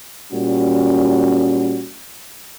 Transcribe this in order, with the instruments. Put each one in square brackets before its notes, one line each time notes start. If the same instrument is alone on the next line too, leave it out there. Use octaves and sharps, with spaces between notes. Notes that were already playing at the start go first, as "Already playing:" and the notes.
[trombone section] A#2 G3 C#4 F#4